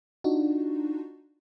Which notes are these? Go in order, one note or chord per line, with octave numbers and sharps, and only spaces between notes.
D4 D#4 F4 F#4